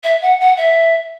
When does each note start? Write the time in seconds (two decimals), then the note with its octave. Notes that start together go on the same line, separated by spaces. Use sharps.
0.03 E5
0.21 F#5
0.40 F#5
0.57 E5